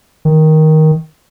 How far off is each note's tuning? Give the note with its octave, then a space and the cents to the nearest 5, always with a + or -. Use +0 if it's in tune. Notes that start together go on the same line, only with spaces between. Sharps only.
D#3 +10